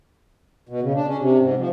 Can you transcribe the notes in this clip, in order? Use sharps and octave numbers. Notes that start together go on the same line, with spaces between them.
B2
C#3
D4
C#4
C3
G#2
F3